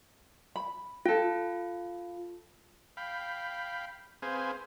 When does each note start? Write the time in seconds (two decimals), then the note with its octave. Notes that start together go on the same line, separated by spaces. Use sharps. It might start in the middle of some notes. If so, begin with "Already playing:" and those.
0.56 B5
1.06 F4 A4 G5
2.97 F5 G5 B5
4.22 C4 G#4 B4 C5 F5 G#5